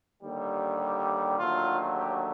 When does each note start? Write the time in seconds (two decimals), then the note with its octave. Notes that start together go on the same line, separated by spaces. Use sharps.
0.23 D#2 D3 G3
1.38 D#2 D3 F#3 A3 F4
1.96 G4